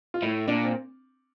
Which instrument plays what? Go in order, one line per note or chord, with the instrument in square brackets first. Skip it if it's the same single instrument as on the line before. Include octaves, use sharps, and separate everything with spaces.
[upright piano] F4
[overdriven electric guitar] A2 [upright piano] E4
[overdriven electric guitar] A#2 [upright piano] D4
[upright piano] C4